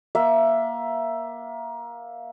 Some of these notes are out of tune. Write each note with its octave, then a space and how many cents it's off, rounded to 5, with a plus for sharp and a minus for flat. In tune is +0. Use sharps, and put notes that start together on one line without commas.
A#3 +20 E5 +10